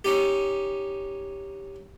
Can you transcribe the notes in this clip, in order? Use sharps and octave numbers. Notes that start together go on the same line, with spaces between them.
C#4 D#4 G4